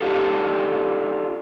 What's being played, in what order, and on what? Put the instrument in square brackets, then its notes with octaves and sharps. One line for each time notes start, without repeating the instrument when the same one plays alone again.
[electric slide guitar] D4 D#4 F4 G4 A4